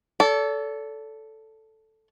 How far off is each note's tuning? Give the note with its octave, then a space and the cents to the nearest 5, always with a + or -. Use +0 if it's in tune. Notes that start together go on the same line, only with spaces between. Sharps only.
A4 +0 D5 -45